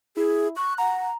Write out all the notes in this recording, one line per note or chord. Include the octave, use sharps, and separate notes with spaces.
E4 G#4
C#6 F#6
F#5 A#5